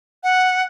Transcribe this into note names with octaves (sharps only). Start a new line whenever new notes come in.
F#5